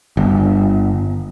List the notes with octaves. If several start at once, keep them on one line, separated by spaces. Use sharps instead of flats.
G1